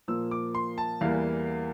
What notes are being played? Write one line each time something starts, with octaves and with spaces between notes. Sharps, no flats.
A#2 F3 A#3 E6
D6
C6
A5
E2 E3 G3 A#3 F5